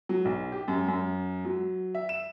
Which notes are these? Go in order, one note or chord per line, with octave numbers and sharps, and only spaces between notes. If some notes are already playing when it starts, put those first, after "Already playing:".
F#3
B1
G4
F#2
F#2
F#3
E5
E7